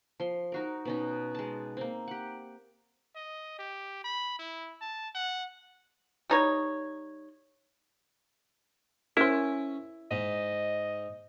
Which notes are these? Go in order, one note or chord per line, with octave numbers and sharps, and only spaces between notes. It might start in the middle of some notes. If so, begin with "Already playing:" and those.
F3 C6
D#4 F#4 A#4
B2 C#4 D#4
G#3 A5
A#3 C4
G4 F#5
D#5
G4
B5
E4
A5
F#5
G3 D#4 C#5
C#4 E4 A#4 C5
G#2 D#5